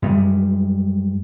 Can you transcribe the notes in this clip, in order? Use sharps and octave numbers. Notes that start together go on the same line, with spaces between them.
F#2 G3 G#3